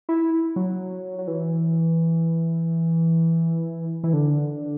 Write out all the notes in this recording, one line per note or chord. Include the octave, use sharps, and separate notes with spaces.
E4
F#3
F#3
E3
E3
D3